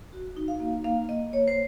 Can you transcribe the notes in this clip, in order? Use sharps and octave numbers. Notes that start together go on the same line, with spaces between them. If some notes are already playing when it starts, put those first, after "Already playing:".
F#4
D#4
F5
A#3
A#3 F5
A#3 D#5
A#3 C#5
C5